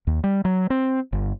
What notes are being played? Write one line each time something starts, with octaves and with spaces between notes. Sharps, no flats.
D#2
G3
F#3
C4
G1